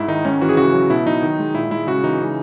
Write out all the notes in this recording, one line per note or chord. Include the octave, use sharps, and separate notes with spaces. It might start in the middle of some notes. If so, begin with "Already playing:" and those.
Already playing: G#2 E4
D#3 D#4
G#2 C#4
E3 F#4
G#4
C#3 F#4
F#3
B2 E4
F#3 D#4
D#3
G#3
A#2 E4
G#3 E4
C#3 F#4
E3 D#4
C#3